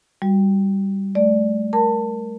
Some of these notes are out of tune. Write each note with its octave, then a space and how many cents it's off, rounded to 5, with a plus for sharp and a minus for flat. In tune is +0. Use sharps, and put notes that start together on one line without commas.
G3 +0 F#4 +0
A3 -25 D5 +0
A#4 +0 A5 +20